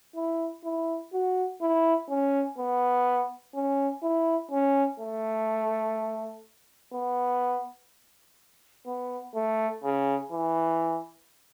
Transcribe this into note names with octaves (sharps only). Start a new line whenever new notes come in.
E4
E4
F#4
E4
C#4
B3
C#4
E4
C#4
A3
B3
B3
A3
C#3
E3